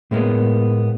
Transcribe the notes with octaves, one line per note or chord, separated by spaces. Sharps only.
A2 G#3 A#3 B3